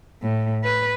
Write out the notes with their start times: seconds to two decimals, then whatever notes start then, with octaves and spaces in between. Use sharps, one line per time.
0.22 A2
0.64 B4